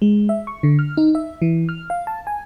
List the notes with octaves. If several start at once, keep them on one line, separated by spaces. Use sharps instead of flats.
G#3
E5
C#6
D3
F6
D#4
E5
E3
F6
F5
A5
G#5